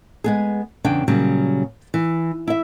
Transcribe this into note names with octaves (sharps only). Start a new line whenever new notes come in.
G#3 B3 G#4
E2 C#3 D4 G5
A#2 C#3 F#3 G3
E3
E4 E5